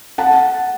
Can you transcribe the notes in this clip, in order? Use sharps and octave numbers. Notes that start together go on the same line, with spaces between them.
F#5 A5